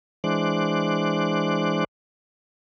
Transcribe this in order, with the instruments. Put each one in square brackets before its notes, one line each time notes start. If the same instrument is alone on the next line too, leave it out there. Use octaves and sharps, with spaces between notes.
[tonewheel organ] E3 G#3 D4 C5 D6 F#6